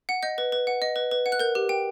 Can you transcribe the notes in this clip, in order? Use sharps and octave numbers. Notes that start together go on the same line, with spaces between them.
F#5
D#5 G6
B4
B4
F#5
D#5
B4
B4
F#5
F#6
A#4 G6
G4
G5